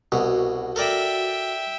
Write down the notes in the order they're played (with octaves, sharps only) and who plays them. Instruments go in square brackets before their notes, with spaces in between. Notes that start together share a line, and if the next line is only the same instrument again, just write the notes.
[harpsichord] C2 B2 [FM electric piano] F#4
[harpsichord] A4 A#4 D5 [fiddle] E5 G5